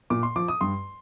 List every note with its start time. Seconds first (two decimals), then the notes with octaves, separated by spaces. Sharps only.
0.10 A#2 D6
0.23 C6
0.36 F3 D6
0.48 D#6
0.61 G2 C6